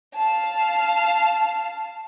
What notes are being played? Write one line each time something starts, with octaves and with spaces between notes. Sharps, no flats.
F5 A5